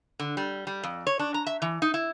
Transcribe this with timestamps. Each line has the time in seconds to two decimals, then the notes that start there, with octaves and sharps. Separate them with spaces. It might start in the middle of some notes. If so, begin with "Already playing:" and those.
0.19 D3
0.37 G3
0.67 G3
0.83 F2
1.07 C#5
1.19 D4
1.34 A#5
1.46 E5
1.62 E3
1.82 D#4
1.94 E4